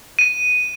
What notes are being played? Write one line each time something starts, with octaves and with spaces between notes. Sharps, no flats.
D#7